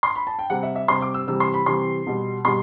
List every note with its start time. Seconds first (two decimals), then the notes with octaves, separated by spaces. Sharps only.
0.03 C6
0.16 B5
0.27 A5
0.39 G5
0.50 C3 G3 F#5
0.63 E5
0.76 E5
0.88 C3 G3 C6
1.02 D6
1.14 E6
1.27 C3 E3 G3 E6
1.40 C6
1.54 B5
1.66 C3 E3 G3 C6
2.07 B2 G3
2.45 B2 G3 C6